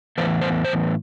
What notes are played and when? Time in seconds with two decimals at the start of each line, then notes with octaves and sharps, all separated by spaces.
0.18 A2 E3 B3 C5
0.41 C5
0.65 C5